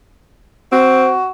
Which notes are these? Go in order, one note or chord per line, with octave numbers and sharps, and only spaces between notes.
C4 F#4